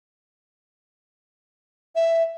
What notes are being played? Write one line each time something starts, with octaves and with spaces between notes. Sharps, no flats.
E5